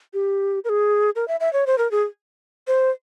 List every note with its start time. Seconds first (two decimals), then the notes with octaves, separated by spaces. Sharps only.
0.14 G4
0.65 A#4
0.69 G#4
1.16 A#4
1.28 E5
1.40 E5
1.53 C#5
1.67 C5
1.78 A#4
1.91 G#4
2.67 C5